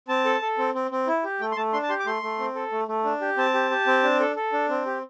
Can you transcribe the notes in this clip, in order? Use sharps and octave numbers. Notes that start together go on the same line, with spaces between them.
C4 A5
A4
A4
C4
C4
C4
E4
G4
A3 G5
C6
A3 A5
D4 C6
A5
G4 C6
D6
A3 C6
A3
C4
A4
A3
A3
D4
G4
C4 A5
G4
G4
C4
D4
A4
A4
D4
C4
G4